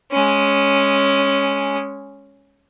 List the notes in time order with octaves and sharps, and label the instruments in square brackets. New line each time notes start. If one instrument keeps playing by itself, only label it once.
[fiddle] G#3 C#4